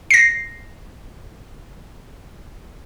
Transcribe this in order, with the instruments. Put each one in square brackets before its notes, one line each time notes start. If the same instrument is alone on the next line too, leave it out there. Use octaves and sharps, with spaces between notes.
[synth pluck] A#6 C7